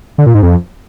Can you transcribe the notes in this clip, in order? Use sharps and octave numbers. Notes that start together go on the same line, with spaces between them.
D3
A#2
G#2
F2